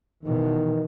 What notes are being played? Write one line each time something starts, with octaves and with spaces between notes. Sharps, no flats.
B2 D#3 E3